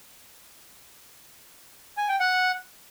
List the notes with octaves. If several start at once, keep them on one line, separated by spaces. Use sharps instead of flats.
G#5
G5
F#5